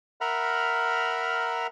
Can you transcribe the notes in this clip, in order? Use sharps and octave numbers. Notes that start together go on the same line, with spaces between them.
A#4 E5 F#5 A#5 B5 F6